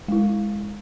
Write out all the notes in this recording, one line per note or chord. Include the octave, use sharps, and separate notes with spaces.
G#3 E4